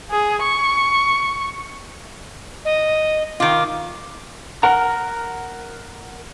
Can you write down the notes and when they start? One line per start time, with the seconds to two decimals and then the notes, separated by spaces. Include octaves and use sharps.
0.11 G#4
0.42 C#6
2.65 D#5
3.40 D#3 F4 D6
4.63 A#4 F#5 A#5